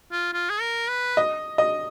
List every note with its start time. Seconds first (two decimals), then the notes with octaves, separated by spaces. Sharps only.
0.12 F4
0.33 F4
0.50 G#4
0.61 A#4
0.89 B4
1.17 D#5
1.58 D#5